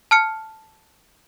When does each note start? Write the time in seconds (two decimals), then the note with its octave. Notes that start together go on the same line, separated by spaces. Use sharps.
0.11 A5 F6 C#7